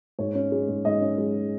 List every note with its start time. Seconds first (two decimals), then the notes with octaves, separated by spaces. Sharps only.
0.19 G#2 C#5
0.35 C#4
0.52 G#3
0.68 G#2
0.85 G#2 D#5
1.01 C#4
1.18 G#3